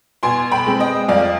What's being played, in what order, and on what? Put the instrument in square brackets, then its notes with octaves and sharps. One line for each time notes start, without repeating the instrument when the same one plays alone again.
[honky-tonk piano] B2 G#5 C6
G5 B5
G#3 C4
D#5 G5
F2 D5 F5